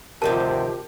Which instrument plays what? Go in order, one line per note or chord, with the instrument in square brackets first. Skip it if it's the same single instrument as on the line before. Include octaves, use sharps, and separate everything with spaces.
[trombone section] D2 C3 [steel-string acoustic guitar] G2 D#3 F3 [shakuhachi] G4 [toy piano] A#4 A5